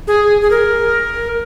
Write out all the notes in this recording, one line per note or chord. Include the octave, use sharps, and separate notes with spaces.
G#4
G#4
A#4